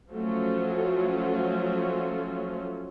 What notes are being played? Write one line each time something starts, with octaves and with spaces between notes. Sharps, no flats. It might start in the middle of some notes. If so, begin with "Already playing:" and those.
F3 F#3 A3 C#4 F4